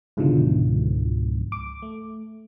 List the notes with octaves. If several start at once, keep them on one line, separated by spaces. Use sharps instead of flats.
C#2 G#2 B2 D3 E3 F3
D6
A3